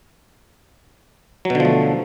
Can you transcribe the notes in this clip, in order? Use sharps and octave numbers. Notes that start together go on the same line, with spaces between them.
B2 D3 F3 F#3 A3